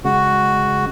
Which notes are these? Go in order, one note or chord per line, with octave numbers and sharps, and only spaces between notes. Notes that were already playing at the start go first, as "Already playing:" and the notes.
C#3 G#3 F#4